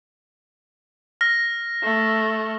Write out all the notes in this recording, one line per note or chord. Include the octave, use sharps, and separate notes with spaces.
F6 A#6
A3